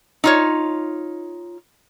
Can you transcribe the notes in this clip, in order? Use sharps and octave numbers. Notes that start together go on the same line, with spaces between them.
D#4 F4 C#5